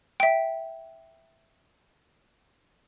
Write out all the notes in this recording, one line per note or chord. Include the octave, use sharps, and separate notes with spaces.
E5 G5